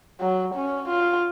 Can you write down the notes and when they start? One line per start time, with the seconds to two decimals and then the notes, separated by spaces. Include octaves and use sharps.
0.20 F#3
0.54 C#4
0.89 F4